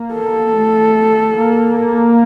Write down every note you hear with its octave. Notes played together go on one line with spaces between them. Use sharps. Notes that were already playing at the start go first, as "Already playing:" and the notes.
Already playing: A#3
A4
A3
A#3